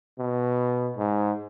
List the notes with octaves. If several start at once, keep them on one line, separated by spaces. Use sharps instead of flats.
B2
G#2